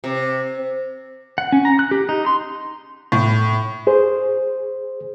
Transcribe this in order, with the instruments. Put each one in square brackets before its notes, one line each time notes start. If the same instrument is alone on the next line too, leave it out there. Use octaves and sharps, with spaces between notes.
[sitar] C3
[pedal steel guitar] F#5
C#4
A#5
F#6
G4
D#4
C6
[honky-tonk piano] A2
[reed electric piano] G#4 C5